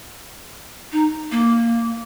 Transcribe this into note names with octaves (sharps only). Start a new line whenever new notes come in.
D#4
A#3